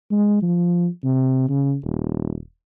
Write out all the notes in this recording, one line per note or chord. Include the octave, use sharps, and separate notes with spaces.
G#3
F3
C3
C#3
D#1